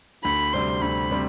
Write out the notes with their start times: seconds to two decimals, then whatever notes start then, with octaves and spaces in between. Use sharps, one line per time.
0.24 D2 B5
0.53 C3 G3 C4 C6
0.82 D2 B5
1.11 C3 G3 C4